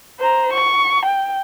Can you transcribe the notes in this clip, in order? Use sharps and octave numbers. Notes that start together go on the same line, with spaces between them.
C5 A#5
C#6
G5